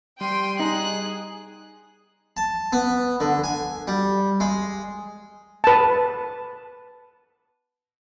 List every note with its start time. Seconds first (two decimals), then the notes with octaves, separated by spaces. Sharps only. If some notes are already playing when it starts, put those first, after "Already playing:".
0.21 G3 G5 C6 D#7
0.60 D#4 G#4 F#6
2.37 A5
2.73 B3
3.20 D3
3.44 G#5
3.88 G3
4.40 G#3
5.64 B4 A5